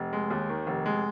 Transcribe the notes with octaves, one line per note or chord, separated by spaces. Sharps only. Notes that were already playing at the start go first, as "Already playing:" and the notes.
Already playing: F1
G#3
D#2
D#3
F1
G#3